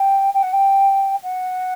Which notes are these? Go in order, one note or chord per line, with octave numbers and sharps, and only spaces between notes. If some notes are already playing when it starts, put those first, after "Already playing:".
Already playing: G5
G5
F#5
G5
F#5